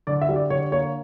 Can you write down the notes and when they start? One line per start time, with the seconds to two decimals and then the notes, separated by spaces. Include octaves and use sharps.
0.07 D3 D5
0.21 E5
0.29 G3
0.36 D5
0.50 D3 C#5
0.72 A#3 C#5